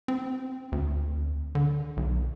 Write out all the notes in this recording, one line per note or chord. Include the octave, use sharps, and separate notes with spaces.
C4
D2
D3
B1